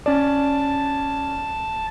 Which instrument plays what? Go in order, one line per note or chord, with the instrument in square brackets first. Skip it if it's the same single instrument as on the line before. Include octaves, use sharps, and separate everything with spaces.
[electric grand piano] C#4 D5 [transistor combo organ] A5